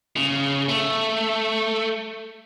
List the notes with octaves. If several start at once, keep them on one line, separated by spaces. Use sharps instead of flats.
C#3
A3